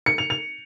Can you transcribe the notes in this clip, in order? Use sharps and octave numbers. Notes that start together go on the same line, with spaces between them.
C#7
F7
F7